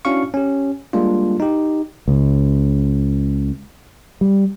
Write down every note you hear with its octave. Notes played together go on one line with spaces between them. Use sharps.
C#4 D4 E4 F#4 F5 C#6
C#4 G4
G3 G#3 A#3 D4 F4
D#4 G4
C#2
G3